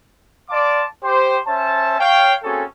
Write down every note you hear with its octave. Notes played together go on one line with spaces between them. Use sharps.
D5 F5 A5 C6 D6
G4 C5
C#4 C5 E5 A5
C#5 F5 G5
A#3 C4 C#4 F#4 G#4 A4